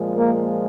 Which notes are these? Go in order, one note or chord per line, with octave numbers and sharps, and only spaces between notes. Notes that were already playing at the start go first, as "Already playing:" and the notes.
Already playing: A#2 F3 G#3
A#3